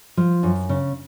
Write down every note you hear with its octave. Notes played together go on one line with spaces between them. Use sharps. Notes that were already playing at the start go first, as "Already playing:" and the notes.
F3
F#2
C#3